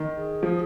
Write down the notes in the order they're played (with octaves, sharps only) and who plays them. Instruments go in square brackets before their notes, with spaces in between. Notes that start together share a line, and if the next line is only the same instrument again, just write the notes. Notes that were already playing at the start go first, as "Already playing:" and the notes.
Already playing: [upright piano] D#3
[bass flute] G#4
[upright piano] F3